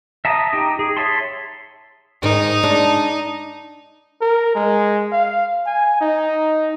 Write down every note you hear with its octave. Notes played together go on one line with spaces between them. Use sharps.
E5 A5 A#5 D#6
D#4 G4
G#4
C#5 E5 A5 C6
G#2 D#3 D#4
G#3 D4
A#4
G#3
F5
G#5
D#4